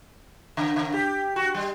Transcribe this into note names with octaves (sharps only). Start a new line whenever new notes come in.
C#3
C#3
G4
F#4
G3